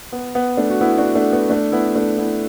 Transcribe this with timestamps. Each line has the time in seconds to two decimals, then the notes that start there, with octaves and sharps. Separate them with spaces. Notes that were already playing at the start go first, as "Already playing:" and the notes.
0.12 B3
0.35 B3
0.57 A3 D4
0.70 F#4
0.81 B3 E4
0.98 D4 F#4
1.15 A3 D4
1.32 B3
1.50 A3 D4
1.72 B3 E4
1.95 A3 D4
2.18 B3 E4